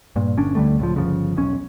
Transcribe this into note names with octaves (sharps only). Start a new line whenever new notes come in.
G2 A#2
G1 C#4 D4
D2 D3 G3 A3
C#2 A2 F3
G1 C#3 F3
E1 B1 C#4